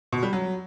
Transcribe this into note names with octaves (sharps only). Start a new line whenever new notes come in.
B2
G3
F#3